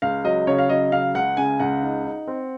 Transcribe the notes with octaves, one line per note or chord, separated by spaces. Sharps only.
C#2 F5
F#3 D#5
C#3 C#5
F5
F#3 D#5
C#3 F5
C#2 F#5
C#3 G#5
C#2 F#5
D#4
D#4
C4